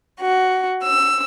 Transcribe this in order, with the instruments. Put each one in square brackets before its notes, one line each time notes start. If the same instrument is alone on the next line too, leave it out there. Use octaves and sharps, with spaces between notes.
[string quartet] F#4
E6